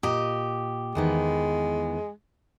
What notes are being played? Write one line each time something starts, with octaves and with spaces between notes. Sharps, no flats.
A#2 G4 D#5
E2 D#3 G#3 B3